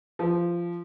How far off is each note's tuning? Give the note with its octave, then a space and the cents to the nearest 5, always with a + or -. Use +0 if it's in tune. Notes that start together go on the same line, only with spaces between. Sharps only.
F3 -15